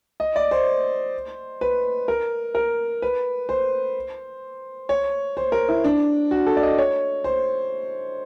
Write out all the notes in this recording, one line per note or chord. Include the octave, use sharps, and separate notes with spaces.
D#5
D5
C5
B4
A#4
A#4
B4
C5
C#5
C5
A#4
E4
D4
F#4
A4
D5
D#5
C#5
C5